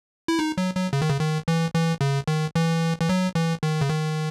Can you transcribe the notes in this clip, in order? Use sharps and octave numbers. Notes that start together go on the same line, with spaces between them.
E4
D#4
F#3
F#3
C#3
D#3
C#3
D#3
E3
E3
C#3
D#3
E3
E3
F#3
E3
D#3
C#3
D#3